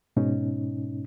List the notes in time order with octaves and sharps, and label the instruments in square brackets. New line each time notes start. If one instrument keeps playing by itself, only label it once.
[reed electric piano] G#2 B2 C#4 D#4